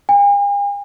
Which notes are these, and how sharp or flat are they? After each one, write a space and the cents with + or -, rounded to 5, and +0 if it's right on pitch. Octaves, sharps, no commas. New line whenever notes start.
G#5 -45